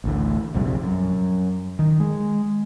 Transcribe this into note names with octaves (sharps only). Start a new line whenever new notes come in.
A1 D2 A2
A#1 F2 C3 G3
F#2
D#3
G#3